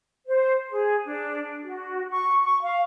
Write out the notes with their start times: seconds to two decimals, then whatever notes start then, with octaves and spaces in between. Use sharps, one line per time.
0.27 C5
0.70 G#4
1.06 D4
1.63 F#4
2.10 C#6
2.44 C#6
2.64 F5